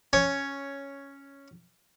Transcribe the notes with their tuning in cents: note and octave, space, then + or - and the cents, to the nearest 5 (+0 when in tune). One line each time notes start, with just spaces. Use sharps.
C#4 +0 C#5 +5